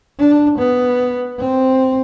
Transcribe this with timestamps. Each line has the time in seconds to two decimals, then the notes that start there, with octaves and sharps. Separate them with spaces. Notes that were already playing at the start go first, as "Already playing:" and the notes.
0.19 D4
0.59 B3
1.39 C4